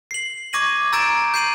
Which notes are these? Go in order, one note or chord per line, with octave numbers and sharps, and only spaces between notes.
C7 F#7
C#6 D6 G#6 A#6 D#7 F#7
A#5 E6 G6 A6 D7 E7
G6 C7 D#7 F#7